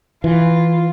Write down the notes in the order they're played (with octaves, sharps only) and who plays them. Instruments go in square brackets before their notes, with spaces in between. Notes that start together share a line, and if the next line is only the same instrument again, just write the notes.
[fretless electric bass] E3 [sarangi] F4